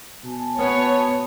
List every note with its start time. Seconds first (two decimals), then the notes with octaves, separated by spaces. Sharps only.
0.24 B2 G#5 A5
0.58 B3 C#5